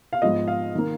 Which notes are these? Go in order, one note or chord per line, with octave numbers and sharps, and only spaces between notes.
F5
G#2 F3 B3 D#5
F5
D#3 A#3